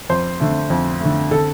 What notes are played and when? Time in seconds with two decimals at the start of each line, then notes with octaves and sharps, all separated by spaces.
0.09 F2 C5
0.40 D3 A3
0.70 F2
1.00 D3 A3
1.31 D3 A4